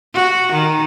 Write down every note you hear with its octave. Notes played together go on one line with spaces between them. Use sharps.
F#4
D#3